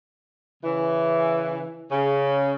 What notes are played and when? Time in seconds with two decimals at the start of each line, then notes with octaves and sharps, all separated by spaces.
0.64 C#3 E3
1.92 C#3